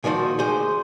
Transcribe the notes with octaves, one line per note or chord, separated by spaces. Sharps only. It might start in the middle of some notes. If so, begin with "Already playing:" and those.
A#2 D#3 F3 F#4
D2 G#4 C5